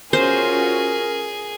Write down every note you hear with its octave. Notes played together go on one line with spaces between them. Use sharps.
C#4 F4 F#4 G#4 A#4 C5